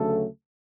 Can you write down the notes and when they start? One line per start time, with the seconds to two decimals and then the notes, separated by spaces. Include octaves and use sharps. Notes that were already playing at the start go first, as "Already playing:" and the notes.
Already playing: D2 C#3 F#3 A3 A4